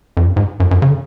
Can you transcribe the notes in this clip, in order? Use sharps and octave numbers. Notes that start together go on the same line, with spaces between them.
F2
F#2
G#2
F#2
F#2
C#3
D3